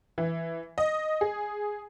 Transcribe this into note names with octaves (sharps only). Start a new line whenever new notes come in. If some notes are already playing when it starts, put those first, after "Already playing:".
E3
D#5
G#4